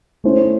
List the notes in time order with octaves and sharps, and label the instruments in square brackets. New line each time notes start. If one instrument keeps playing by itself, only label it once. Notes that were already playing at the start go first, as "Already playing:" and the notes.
[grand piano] A3 C#4 E4 C5